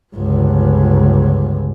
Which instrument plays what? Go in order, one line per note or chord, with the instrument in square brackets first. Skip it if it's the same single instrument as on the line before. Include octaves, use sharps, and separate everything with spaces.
[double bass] G1 C#2